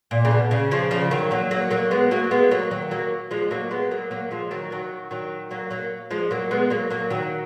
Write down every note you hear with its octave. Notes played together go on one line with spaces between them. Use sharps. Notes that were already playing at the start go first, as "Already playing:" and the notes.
A#2
C#3
B2
C#3
C#3 F3
C#3 F3
D#3 F#3
F#3 A#3
F#3 A#3
F#3 A#3
G#3 B3
F#3 A#3
G#3 B3
F#3 A#3
D#3 F#3
F#3 A#3
F3 G#3
F#3 A#3
G#3 B3
F#3 A#3
F#3 A#3
F3 G#3
D#3 F#3
D#3 F#3
D#3 F#3
F#3 A#3
F#3 A#3
F3 G#3
F#3 A#3
G#3 B3
F#3 A#3
F#3 A#3
D#3 F#3